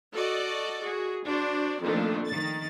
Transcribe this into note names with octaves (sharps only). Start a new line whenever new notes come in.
F#4 A4 D5 D#5
F#4 G#4
D4 F#4 C5 D5
F2 A#2 D#3 F3 A3 D4
D#3 A6